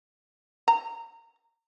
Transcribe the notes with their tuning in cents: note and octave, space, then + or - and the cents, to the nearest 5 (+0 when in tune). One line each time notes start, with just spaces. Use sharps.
A#5 -25